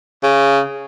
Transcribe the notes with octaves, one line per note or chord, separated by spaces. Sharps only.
C#3